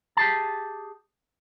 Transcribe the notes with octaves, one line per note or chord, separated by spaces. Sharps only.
G4 G#4 A5